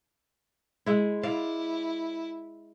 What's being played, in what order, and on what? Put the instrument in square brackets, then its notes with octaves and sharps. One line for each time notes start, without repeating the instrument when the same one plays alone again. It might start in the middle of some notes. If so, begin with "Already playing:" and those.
[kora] G#3 E4
[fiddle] E4 [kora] D5 F5